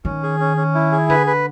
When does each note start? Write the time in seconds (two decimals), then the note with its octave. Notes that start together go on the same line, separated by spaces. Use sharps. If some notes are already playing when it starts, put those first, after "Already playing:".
0.05 D#3 C#4
0.23 G#4
0.40 C#4
0.57 C#4
0.75 E4
0.92 G#4
1.10 D3 B4
1.27 B4